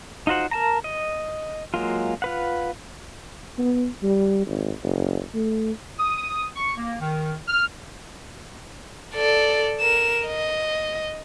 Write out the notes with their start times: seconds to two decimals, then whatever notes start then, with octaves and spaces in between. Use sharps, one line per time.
0.27 D#4 F4 F#4 C5 F#5
0.51 A#4 A5 A#5
0.84 D#5
1.74 F#3 G#3 A#3 F4
2.22 F4 B4 F#5
3.58 B3
4.03 G3
4.46 G#1
4.83 F#1
5.34 A3
6.00 D#6
6.56 C#6
6.77 A#3
7.00 D#3
7.48 F6
9.15 A4 D5
9.80 A#4 E7
10.27 D#5